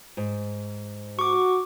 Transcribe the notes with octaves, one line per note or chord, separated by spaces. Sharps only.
G#2
F#4 C#6 D6